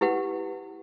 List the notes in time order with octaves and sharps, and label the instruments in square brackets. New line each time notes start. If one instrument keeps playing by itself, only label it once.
[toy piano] E4 G4 B4 F#5